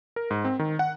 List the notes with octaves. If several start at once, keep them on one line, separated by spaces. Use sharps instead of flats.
A#4
G#2
C4
D#3
F#5